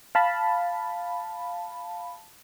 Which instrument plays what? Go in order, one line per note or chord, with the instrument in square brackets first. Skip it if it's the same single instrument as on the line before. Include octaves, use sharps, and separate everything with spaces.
[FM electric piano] F5 A5 B5